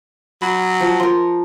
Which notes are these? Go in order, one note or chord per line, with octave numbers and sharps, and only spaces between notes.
F#3 B5
F3
F3 A#4 C6